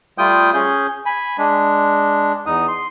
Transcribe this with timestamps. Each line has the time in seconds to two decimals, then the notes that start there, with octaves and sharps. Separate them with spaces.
0.18 G3 A3 F4 G5 D#6 G6
0.54 C#4 G#4 G6
1.06 G#5 B5
1.38 G#3 D4
2.46 E2 D#4 D#6
2.68 C6